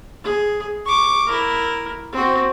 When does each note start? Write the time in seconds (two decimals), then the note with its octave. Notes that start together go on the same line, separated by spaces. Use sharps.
0.23 G#4
0.86 C#6 D6
1.28 E4 A#4
2.12 C4 F#4